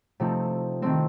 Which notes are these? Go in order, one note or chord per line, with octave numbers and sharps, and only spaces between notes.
C3 F3 A3 C4 D#4
D#3 A3 C4